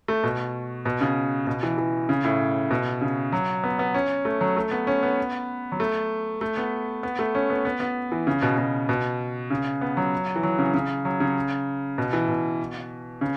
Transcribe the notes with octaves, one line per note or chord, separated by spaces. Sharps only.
A3
B2
B2
C#3
B2
E3
E3
C#3
A2
B2
C#3
F#3
B3
B3
C#4
A3
F#3
A3
B3
C#4
B3
F#3
A3
A3
B3
B3
A3
C#4
B3
B3
B3
E3
C#3
B2
B2
B2
C#3
B3
F#3
E3
F#3
C#3
C#3
F#3
C#3
B2
E3
B2
C#3